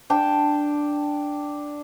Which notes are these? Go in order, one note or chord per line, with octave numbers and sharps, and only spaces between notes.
D4 G5 A5